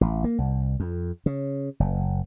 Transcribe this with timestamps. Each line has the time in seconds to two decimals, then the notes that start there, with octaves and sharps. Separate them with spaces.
0.01 A1
0.24 A#3
0.38 C2
0.80 F2
1.26 C#3
1.80 F#1